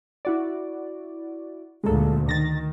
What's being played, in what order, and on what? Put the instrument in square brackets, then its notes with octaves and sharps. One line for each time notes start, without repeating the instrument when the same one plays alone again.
[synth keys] E4 F#4 D5
[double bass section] D2 A#2 [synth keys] G#3 A#3 A4
[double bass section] D#3 [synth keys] A6 A#6